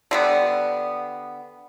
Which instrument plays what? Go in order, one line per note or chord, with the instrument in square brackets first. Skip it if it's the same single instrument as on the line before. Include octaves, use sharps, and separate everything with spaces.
[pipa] D3 G3 B3